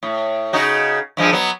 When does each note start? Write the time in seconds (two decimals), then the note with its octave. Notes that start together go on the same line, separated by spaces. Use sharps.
0.03 A2
0.53 C#3 D#4 F#4
1.17 G2 F3 G#3
1.32 F#3 B3